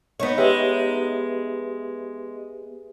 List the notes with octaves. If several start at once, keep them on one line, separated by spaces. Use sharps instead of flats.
B3 D#4 C#5
G#3 G4 B4 E5